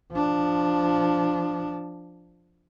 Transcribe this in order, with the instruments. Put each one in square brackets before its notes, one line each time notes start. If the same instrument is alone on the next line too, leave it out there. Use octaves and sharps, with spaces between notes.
[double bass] F3 D4